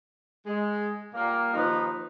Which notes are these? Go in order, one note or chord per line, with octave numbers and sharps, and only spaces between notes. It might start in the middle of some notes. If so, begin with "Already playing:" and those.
G#3
A#2 G3 A#3
D#2 F3 D#4 B4